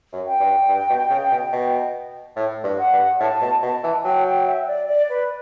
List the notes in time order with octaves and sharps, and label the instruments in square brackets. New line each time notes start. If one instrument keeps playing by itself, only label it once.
[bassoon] F#2
[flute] G5
[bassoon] G2
G2
B2
C#3
B2
B2
A2
G2
[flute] F#5
[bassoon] G2
[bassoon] A2 [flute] A5
[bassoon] B2
[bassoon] B2 [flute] A5
[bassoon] E3
[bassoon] F#3 [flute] G5
[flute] G5
E5
D5
D5
B4